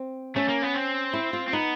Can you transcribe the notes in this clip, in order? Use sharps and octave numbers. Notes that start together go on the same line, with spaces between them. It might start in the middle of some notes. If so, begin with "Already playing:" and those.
Already playing: C4
A3 C#4
A#3
B3
C4
E4
F4
C4
B3 D#4